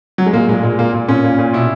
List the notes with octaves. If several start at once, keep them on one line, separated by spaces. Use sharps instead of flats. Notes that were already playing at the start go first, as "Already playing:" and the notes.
F#3
G#3
A#2 A#3
A#2 G#3
A#2 G#3
A#2 A#3
A#2
A#2 C#4
A#2
A#2
B2 E4